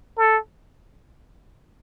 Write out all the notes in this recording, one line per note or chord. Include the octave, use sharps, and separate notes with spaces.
A4